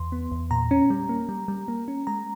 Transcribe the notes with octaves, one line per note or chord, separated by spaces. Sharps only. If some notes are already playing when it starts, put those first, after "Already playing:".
Already playing: E2 C6
B3
E2
A#2 A#5
C#4
G3
A#3
G3
G3
A#3
C#4
G#3 A#5